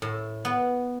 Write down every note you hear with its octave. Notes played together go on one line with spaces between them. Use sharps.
A2
B3